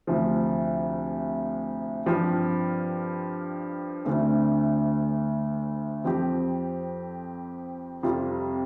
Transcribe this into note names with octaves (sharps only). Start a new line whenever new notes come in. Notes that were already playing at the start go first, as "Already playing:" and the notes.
D2 C3 F3
G2 F3 C4 G4
D2 D3 A3 C4
F2 F3 C4 G4
F2 C3 G3 F4